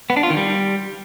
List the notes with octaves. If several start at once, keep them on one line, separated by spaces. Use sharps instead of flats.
B3
D4
F4
D#3
G3